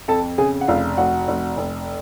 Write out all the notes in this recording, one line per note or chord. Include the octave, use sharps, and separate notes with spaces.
F2 A4 A5
C#3 G#4 G#5
F#5
F1 F4 F5
F1 F#4 F#5
F1
F1